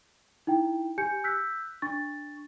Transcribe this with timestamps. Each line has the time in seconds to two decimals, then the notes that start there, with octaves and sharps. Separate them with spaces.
0.47 D#4 E4 G5
0.98 G4 G#5 G6 C#7
1.24 E6 F#6 G6 B6
1.82 D4 C#6 A6